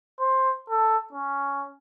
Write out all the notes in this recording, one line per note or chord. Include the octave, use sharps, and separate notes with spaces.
C5
A4
C#4